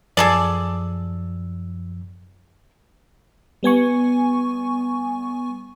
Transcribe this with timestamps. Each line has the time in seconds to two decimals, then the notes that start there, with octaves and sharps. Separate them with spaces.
0.17 F#2 F3 G#4 A4 D5 E6
3.63 G3 B3 G#5 C#6